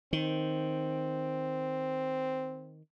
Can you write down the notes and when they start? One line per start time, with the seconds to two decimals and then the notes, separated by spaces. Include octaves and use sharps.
0.13 D#3 C4